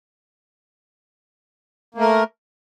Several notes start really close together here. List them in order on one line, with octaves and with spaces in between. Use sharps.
A#3 A3 A#4